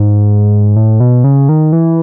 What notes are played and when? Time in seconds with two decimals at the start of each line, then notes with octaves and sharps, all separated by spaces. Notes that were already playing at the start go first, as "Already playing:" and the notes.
Already playing: G#2
0.76 A2
1.00 B2
1.24 C#3
1.49 D#3
1.73 E3